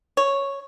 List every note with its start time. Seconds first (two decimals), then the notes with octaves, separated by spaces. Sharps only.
0.17 C#5